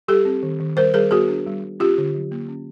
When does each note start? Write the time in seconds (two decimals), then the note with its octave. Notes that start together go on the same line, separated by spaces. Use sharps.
0.08 G3 G4 A4
0.25 C4
0.43 D#3
0.60 D#3
0.77 G3 A#4 C5
0.94 G3 G#4 A#4
1.11 B3 F#4 G#4
1.28 D4
1.46 G3
1.64 G3
1.80 C#4 F4 G4
1.98 D3
2.15 F#3
2.32 A#3
2.48 C#4